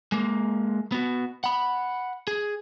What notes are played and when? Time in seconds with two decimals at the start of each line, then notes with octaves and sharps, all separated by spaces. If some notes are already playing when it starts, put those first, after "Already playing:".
0.12 G#3 A#3
0.92 B3 F#4
1.44 F#5 B5
2.27 G#4